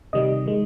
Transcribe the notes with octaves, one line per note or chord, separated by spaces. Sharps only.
C3 D#3 G3 D#5
D#3 G#3